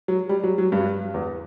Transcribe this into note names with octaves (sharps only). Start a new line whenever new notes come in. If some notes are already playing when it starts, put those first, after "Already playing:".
F#3
G3
F#3
F#3
G2
E2